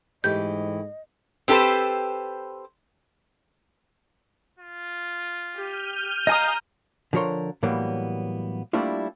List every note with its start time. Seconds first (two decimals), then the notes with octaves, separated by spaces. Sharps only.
0.24 G#2 E3 A3 G4 D#5 G6
1.48 C4 G4 A4 B4 C5
4.59 F4
5.55 G4 F6 G6 D#7
6.27 D#5 F5 G#5 A#5 D#6
7.13 D3 F3 G#4 A#4 C#5 C6
7.63 A2 E3 F#3 G3 A#3 B3
8.73 G3 A3 A#3 D4 E4 F4